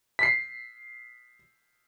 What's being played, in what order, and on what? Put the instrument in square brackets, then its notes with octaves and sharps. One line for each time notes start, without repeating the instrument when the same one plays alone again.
[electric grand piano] B6 C7